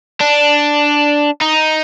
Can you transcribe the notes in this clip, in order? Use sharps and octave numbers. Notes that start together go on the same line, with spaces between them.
D4
D#4